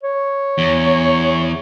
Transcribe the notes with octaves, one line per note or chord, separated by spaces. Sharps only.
C#5
E2